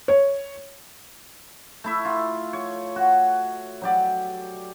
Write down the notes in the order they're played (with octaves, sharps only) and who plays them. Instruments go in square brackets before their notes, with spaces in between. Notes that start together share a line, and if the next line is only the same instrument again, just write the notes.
[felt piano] C#5
[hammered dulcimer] A3 E4 E5
F4
C#5
F#4
F#3 G4 D5